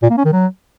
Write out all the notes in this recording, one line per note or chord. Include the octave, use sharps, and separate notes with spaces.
A#2
A#3
C#4
D#3
F#3